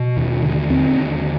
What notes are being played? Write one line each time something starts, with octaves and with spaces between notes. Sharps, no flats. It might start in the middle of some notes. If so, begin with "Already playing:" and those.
Already playing: B2
D#2
D3
D#2 C4
D3